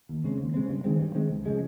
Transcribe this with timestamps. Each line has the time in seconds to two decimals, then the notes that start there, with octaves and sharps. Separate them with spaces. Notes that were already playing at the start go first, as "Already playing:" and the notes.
0.09 D#2
0.24 C#3 G#3 C4
0.40 D#2
0.54 C#3 G#3 C4
0.70 G2
0.84 D#3 G#3 C4
1.00 G2
1.14 D#3 G#3 C4
1.30 C#2
1.46 C#3 F3 G#3